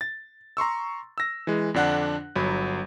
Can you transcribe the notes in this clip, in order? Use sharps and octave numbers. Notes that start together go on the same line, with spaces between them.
A6
A#5 C6 C#6 E6
E6 A#6
E3 G#3
F2 D3 D4 F#5 F#6
G1 F#3 B5